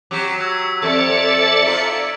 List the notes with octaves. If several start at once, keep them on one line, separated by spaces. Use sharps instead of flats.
F#3 G4 D6 B6
E6 G#6
F2 A4 D5 E5 A5 C#7
G#6 D7 F#7
D#4 F4 B6